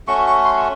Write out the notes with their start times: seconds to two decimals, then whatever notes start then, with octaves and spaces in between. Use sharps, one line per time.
0.08 A3 C#4 F#4 C#6
0.27 C#6
0.45 C6